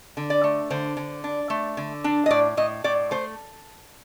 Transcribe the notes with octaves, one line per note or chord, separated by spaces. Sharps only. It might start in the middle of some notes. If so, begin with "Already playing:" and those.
D3
D5
A3
D3 C5
D3
D4
A3
D3
D4
D#5
A2 D5
A2 D#5
A2 D5
A3 C5